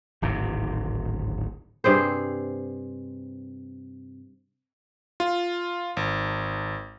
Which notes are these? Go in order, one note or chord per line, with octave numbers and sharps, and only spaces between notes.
D1 G#1 G#2 C3
G2 C3 G#4 C5
F4
G#1